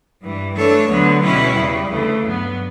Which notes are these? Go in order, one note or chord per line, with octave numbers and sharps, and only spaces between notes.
G2 E3 G3
E3 A3 D4 A4 C#5
D2 D3 F#3 B3
B2 G3 C#4 E4 B4
E2 C#3 G3
D2 C#3 E3 A3
G2 F#3 B3